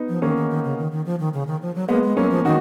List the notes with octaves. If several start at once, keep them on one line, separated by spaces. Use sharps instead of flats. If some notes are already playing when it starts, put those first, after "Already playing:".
Already playing: B3 D#4
F3
D#3 A#3 C#4
D#3
D#3
C#3
D#3
D#3
F3
D#3
C#3
D#3
F3
F#3
G#3 A#3 B3
G#3
F#3 A#3 C#4
F3
D#3 D#4 F#4